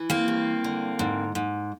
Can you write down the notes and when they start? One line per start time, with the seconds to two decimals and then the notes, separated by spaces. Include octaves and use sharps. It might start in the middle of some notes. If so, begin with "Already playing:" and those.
Already playing: E3
0.10 A#3 C4
0.28 G2
0.64 D3
0.99 G#2
1.35 G#2